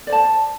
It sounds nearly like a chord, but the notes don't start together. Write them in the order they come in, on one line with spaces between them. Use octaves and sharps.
D5 C5 A5